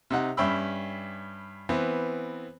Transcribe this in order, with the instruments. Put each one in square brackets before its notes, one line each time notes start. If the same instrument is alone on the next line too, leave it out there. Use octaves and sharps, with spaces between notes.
[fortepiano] C3 D#4 F#5
G2 C#4 E5 G5 B5 E6
E3 B3 C4